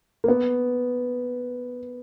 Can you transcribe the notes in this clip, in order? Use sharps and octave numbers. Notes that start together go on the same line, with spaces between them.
A#3
B3